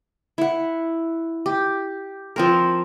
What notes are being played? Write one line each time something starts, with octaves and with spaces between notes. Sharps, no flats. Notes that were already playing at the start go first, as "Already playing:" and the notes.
E4 F#5
G4
F3 C4 A#4